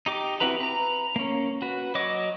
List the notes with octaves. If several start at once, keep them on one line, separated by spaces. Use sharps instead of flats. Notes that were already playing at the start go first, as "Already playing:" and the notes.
D#4 G4 D6
C4 E4 F#4 B4 A#5
B4 A#5
A#3 C#4
F#4 B4
F#3 C#5 D#5 D6